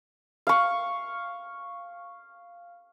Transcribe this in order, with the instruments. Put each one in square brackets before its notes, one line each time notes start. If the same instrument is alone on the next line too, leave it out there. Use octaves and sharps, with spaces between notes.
[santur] F5 C#6